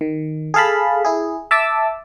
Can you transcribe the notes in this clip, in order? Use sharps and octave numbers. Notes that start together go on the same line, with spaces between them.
D#3
G#4 A4 F5 A5 B5
E4 G#4
E5 A5 D6 E6